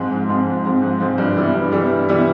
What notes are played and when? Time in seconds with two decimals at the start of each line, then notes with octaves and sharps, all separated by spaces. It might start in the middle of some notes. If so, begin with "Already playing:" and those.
Already playing: G#2 F3 G#3 C4
0.11 G#2
0.29 F3 G#3 C4
0.46 G#2
0.65 F3 G#3 C4
0.82 G#2
1.00 F3 G#3 C4
1.18 G2
1.36 E3 G3 B3 E4
1.55 G2
1.72 E3 G3 B3 E4
1.90 G2
2.09 E3 G3 B3 E4